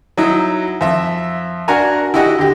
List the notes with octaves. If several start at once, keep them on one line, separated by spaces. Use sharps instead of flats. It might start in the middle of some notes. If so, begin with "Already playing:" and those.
F#3 D#4 E4
F2 E5
D4 F#4 A#4 F#5 G#5 A#5
E4 F#4 G4 D#5 F#5
D3 G4